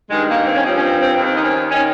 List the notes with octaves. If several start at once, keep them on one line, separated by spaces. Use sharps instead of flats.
G2 D#3 G#3
A#3
C4
C#4
G2 F3 C4
C#4
C4
C4
D#2 D#3 C4
D#4
C#4
D#3 C#4